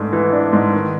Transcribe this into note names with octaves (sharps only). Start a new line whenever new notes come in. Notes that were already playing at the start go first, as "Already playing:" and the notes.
Already playing: G#2 E3 A3 D4
E3
D4
G#2
D#3